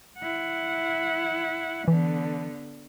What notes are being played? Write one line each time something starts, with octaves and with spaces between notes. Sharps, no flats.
E4 F#5
D3 E3 B3